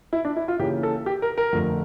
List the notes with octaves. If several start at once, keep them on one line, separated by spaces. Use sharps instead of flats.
E4
D4
E4
F4
C#3 E3 A#3 G4
A4
G4
A#4
A#4
F2 D3 F3 A3